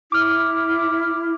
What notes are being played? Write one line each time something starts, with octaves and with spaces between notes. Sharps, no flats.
E4 D6 F6